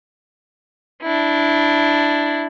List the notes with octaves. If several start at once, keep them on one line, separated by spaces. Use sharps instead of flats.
D4 E4